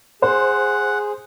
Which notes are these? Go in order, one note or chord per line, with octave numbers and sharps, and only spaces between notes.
G#4 C5 F#5